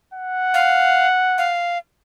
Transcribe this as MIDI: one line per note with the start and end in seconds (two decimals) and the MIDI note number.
0.14 1.53 78
0.54 1.07 77
1.38 1.78 77